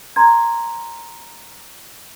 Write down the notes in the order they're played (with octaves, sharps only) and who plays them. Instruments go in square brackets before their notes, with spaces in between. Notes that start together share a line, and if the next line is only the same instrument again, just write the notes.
[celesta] A#5 C6 G#6